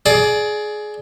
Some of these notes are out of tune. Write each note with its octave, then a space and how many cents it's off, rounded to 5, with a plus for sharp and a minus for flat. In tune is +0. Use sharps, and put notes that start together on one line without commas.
G#4 +20 D5 +0